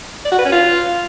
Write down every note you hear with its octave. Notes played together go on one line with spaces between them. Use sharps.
D5
F#4
B4
C#4
F4